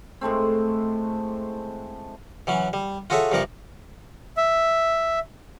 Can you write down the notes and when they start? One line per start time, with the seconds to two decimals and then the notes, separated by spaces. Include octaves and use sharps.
0.21 A2 G#3 A3 C4
2.47 E3 F#3 C#4
2.73 G3
3.10 F4 F#4 G#4 A4 C#5 E5
3.32 G2 C3 F3 A#4 D5 C#6
4.37 E5